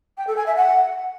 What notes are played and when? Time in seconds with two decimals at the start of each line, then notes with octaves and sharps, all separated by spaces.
0.18 G5
0.27 A4
0.37 G#5
0.46 E5
0.56 F#5